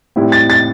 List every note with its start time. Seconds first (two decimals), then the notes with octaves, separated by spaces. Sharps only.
0.16 A2 G3 C4 E4
0.32 A6
0.50 A6